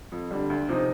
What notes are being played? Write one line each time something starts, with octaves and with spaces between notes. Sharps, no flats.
F2
D3 G3
D2
C3 F3 C4 D#4